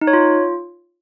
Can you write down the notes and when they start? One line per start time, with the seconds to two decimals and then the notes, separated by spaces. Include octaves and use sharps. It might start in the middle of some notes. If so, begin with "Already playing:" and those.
0.01 D#4
0.07 C#5
0.13 F4